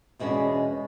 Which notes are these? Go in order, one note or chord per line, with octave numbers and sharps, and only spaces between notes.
E2 B2 G#3 A#3 C#4 D4